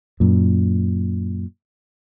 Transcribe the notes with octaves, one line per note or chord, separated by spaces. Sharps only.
F#2 A#2